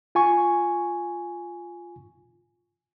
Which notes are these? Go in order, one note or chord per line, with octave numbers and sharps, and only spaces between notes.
F4 G#5 C#6